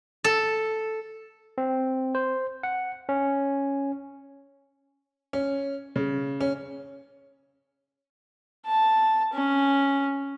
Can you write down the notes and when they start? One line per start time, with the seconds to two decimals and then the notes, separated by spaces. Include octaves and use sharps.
0.24 A4
1.58 C4
2.15 C5
2.63 F#5
3.09 C#4
5.33 C#4
5.96 C#3
6.41 C#4
8.66 A5
9.33 C#4